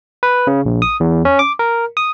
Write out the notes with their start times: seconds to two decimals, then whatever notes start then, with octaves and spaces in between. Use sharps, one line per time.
0.23 B4
0.47 C#3
0.66 A#1
0.82 D#6
1.00 E2
1.25 C#4
1.39 D6
1.59 A#4
1.97 D#6